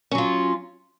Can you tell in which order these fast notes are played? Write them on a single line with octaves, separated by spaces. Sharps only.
C#4 F#3 F4